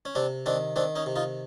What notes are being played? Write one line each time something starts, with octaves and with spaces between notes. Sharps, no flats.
C#4
C3 C4 D4
D#3 C4 D4
D#3 C4 D4
C#4 D#4
C3
D#4 F4